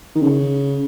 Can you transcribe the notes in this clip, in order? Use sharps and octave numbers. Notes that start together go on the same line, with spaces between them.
D#3
C#3